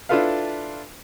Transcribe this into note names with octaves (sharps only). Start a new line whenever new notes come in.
D4 E4 F4 A4 B4 F5